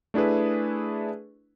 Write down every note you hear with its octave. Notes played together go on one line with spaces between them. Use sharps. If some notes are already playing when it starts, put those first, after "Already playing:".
A3 D4 E4 G#4 B4